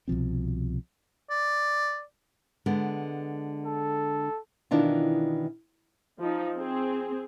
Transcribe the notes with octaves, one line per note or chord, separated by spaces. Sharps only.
C2 B2 F3 C4
D5
D3 G#3 B3
A4
B2 D#3 E3 D4 E4 F4
F3 D#4
C4 G#4